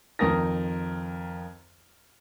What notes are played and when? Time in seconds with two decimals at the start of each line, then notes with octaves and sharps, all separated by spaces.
0.19 F2 D#3 A#4 D#6 A#6